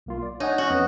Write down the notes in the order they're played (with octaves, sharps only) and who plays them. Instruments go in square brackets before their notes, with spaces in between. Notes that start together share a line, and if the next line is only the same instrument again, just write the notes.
[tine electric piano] B1 A#3 F4
D5
[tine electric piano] D4 [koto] D#4 [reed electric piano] C#5 D#5 F#5 [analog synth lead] G#5
[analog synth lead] C#4 [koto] F#4
[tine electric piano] F2 B3 F#5 [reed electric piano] D#6